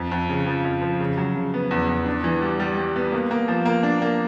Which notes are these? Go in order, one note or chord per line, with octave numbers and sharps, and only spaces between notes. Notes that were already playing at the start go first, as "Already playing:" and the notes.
Already playing: F2
F2
C#3
F3
F2
F3
C#3
F#3
C#3
B3
E2
E2
D4
E3
G3
G3
G3
B3
A#3
A#3
F3
A#3
D4
A#3